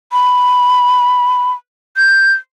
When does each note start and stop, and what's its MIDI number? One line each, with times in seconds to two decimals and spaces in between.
0.13 1.52 83
1.97 2.33 91